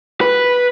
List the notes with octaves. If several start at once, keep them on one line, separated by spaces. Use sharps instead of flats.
B4